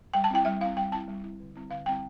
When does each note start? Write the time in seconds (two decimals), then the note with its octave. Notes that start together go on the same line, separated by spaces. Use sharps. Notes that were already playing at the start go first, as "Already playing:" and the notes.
0.14 G3 G5
0.24 A5
0.30 C4 E4 G5
0.45 G3 E5
0.60 C4 E4 F5
0.77 G3 G5
0.92 C4 E4 A5
1.08 G3
1.24 C4 E4
1.40 D3
1.55 G3 C4 E4
1.70 D3 F5
1.86 G3 C4 E4 G5